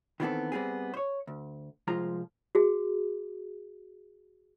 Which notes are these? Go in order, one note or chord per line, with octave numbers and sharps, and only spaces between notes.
D#3 E3 G3 B3 C4 A4
G3 B3 C4 G#4
C5 C#5
D2
C2 F3 G#3 F4 A#5
F#4 G#4